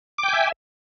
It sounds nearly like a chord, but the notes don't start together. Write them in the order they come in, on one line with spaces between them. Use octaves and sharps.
D6 G5 G#5 E5